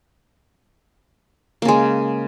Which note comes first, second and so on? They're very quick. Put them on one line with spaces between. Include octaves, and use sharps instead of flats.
A#3 C#3 G#3